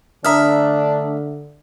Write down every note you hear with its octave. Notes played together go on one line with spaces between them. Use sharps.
D3 A3 D4 E5 A#5 D#6 F6